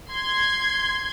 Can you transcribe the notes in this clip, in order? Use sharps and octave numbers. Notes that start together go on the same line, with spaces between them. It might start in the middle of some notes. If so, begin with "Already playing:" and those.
C6 G#6